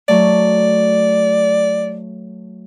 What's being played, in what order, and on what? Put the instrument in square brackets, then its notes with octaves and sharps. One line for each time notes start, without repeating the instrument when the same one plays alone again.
[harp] F#3 A3 [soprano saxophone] D5